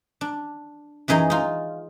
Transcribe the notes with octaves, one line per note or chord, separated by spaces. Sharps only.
D4
F#2 E3 D#4 G#4 D#5
D#4 F4